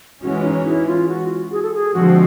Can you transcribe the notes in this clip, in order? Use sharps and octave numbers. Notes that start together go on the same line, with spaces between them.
E3 G#3 C#4 F#4
D#4
E4
F4
F#4
G#4
A4
G#4
D3 F3 G#3 C4 F#4